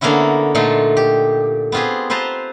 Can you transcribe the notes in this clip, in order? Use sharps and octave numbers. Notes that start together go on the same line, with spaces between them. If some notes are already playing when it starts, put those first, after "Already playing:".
D3 A#3 B3 C#4 E4 F#4
A#2 D3 A3 D#4 F4
G4
B3 C4 F4 G4 G#4
C4 F4 B4 C5 A5 A#5